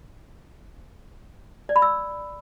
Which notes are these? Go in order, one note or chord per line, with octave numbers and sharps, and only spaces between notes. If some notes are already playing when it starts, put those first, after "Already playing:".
D5
B5
E6